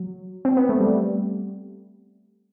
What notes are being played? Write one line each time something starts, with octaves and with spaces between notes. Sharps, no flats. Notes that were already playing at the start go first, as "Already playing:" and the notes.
Already playing: F#3
C4
B3
A3
G3